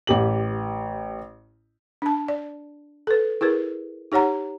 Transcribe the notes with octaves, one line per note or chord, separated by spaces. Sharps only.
A1 G4 F#7
D4 A5
D5
A4 B4
E4 G#4 A#4 B4
D#4 G4 C#5 F#5 A#5